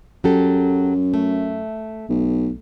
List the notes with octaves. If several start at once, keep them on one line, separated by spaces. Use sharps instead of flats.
F#2 F#3 G4 A4
A3
B1